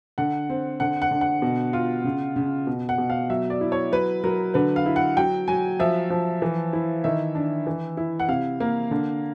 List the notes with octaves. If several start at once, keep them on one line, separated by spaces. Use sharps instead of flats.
D3 F#5
C4
D3 F#5
F#5
D3
F#5
B2
F4
C#3
C#3
B2
F#5
B2
F5
F#3 E5
D5
E4
C#5
F#3 B4
F#3 A#4
D3 B4
F5
E4
F#5
F#3 G5
F#3 G#5
F3 E5
F3
E3
E4
D#3 E5
D4
E3
E4
F#5
C3 F5
A#3
D3